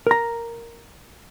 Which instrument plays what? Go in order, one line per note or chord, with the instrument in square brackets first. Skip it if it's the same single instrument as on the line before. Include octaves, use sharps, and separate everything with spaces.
[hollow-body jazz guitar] A#4 A#5